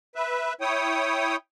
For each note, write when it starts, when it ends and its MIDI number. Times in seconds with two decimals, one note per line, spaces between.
0.16 0.53 71
0.16 0.53 76
0.61 1.36 64
0.61 1.36 73
0.61 1.36 79
0.61 1.36 87